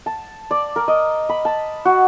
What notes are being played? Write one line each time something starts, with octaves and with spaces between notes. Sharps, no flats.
A5
D5
A#4
D#5
B5
A5
F#4